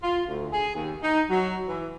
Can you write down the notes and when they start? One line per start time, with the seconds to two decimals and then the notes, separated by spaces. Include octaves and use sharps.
0.03 F4
0.27 D2
0.53 G#4
0.75 D#2
1.03 D#4
1.30 F#3
1.67 E3